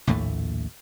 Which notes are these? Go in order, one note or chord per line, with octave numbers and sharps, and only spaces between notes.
A#1 D#2 A2 A3